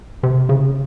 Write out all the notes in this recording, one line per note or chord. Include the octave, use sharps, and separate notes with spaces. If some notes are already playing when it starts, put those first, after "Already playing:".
C3
C#3